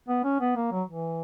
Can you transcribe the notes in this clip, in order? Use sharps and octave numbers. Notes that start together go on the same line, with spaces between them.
B3
C#4
B3
A#3
F#3
E3